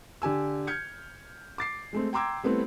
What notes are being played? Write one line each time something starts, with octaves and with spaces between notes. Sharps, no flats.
D3 G4 G#5 E6
F6 G6 G#6 C#7
D6 A6 C7
G#3 A3 C4
G5 A#5 C6 D6 E6 G#6
G3 A3 B3 C4 E4